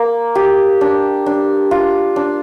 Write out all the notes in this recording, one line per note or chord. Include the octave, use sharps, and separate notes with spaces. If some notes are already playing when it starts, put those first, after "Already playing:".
Already playing: A#3
G4
D4
D4
F4
D4